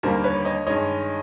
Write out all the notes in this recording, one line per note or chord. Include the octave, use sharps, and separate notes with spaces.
D#2 D3 G3 A#3 A#4 C5
B4 C#5
C#5 D#5
G2 D#3 G#3 C#5 D#5